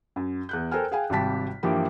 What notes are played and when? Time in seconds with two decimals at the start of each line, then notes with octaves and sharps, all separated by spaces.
0.16 F#2
0.49 E2 F#6 G6
0.71 A4 A#4 C5 G5 G#5 F6
0.91 G#4 F5 G5 G#5
1.10 G#1 C3 G3 G4 A5 B6
1.63 G2 E3 F3 A#3 G4